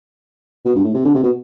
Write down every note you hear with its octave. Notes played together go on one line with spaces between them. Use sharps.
B2
G2
A2
C3
D3
C3
B2